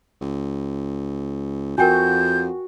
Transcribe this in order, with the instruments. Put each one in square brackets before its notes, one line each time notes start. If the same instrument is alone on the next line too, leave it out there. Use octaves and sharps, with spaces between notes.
[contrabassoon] C#2
[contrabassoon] F2 [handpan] F#4 [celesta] A#4 G5 G#5 [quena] G6